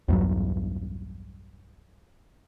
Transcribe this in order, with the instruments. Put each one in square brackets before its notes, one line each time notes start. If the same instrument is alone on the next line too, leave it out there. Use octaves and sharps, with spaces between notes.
[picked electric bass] B1 E2 G2 F#3